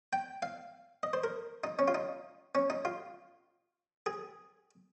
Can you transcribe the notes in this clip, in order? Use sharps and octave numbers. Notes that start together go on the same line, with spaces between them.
G5
F5
D#5
C5
A#4
D#4
C#4
F4
D#4
C#4
D#4
F4
G#4